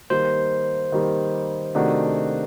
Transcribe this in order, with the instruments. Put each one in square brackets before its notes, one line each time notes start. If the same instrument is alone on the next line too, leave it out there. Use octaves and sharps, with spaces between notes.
[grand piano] D#3 G3 A#3 [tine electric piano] C5
[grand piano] D#3 G3 A#3
C3 D#3 A3 D4 F#4